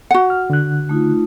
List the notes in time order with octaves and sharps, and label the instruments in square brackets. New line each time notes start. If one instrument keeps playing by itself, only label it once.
[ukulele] F#4 F#5
[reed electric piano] F6
D3 F#6
[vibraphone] A3 D#4 F4